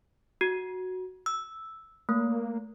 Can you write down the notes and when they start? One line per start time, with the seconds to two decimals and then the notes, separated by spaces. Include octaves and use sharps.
0.41 F#4
1.26 E6
2.09 A3 A#3